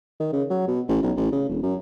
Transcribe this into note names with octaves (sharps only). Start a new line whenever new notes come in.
D#3
C#3
F#3
B2
A1
B1
A1
C#3
E1
F#2